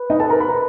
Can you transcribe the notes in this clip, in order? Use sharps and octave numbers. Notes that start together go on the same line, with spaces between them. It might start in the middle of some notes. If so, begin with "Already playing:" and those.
Already playing: B4
D#4 D#5
A4 A5
A#4 A#5
B5
A#5